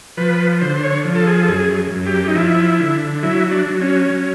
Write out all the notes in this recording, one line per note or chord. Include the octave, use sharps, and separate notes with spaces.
F3 B4
D3 C5
C5
C#5
F3
A4
G#4
A4
F#2 G#4
F#2
G4
D#4
F3 E4
D3
F#3 E4
D4
F#3
C#4
F#3